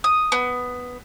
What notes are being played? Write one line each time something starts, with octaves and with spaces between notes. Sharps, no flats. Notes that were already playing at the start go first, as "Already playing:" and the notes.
D#6
B3